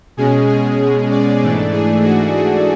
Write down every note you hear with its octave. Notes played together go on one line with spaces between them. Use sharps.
B2 G#3 C#4 G#4
G#4
D5
G#2 E3 A3 D4 D5
G#4
F#4
G#4